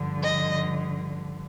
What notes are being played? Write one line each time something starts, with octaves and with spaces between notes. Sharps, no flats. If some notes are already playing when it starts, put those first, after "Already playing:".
Already playing: G2 D3 F3
D#5